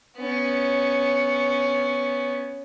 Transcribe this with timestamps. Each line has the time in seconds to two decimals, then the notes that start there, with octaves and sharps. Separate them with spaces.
0.17 B3 C#4